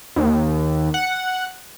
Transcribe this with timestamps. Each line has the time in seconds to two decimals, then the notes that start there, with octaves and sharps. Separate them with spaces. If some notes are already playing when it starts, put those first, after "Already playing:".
0.16 D#2
0.94 F#5